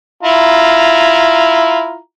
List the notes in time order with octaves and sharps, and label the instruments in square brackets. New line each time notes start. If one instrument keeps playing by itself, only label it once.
[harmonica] E4 F4 A#5